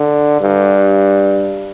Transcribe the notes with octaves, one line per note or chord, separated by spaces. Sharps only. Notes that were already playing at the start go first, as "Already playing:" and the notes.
Already playing: D3
G2